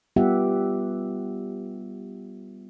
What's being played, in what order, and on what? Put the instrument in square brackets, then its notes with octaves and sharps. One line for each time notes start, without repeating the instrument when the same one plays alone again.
[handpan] G3 B3 F4 G4 E5 F#5